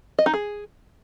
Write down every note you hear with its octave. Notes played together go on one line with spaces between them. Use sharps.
D#5
D#4
G#4